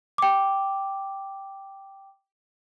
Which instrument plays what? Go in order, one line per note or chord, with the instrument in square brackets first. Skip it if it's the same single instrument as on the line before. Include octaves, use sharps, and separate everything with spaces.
[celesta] G5 D6